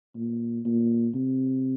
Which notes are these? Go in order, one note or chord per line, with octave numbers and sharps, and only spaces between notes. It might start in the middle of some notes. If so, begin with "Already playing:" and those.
A#2
A#2
C3